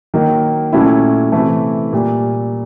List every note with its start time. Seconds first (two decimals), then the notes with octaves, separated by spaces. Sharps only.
0.14 D#3 F#3 A#3 D#4
0.73 A#2 F#3 A3 C#4 E4
1.32 C3 E3 A3
1.93 A#2 G3 A#3